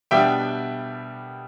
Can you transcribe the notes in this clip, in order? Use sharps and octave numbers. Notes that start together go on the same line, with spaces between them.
B2 G3 B3 D4 E5 G5